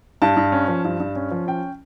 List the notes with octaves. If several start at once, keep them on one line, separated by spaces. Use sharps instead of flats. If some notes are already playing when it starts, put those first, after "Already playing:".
G2 A5
G2
C#4
F3
G2
G2
C#4
F3
C#4 G5